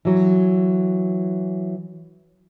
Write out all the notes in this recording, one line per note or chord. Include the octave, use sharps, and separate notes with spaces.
E3 F#3